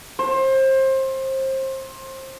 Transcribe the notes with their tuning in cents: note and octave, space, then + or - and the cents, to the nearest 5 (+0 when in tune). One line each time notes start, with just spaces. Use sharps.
C5 +25